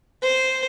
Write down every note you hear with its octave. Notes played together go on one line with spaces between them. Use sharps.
C5